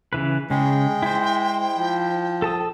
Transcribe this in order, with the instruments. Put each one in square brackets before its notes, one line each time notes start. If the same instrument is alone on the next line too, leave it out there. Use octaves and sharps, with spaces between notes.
[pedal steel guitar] C#3 E3 B4
[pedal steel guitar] C#3 [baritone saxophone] G#3 [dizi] G5
[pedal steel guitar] E4 C5
[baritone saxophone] F3
[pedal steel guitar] A4 A5 D#6